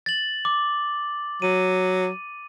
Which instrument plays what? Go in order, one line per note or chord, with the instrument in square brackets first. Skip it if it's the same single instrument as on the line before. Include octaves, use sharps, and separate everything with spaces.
[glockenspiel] A6 F#7
D6
[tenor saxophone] F#3 [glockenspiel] D#7